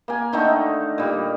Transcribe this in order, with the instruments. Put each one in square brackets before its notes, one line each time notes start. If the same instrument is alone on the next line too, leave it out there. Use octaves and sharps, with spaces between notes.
[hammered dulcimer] A#3 G#5
D3 D#3 A3 D#4
A#2 G3